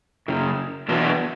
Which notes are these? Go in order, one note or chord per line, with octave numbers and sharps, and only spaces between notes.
F#2 C#3
E2 B2 F#3 B3 D4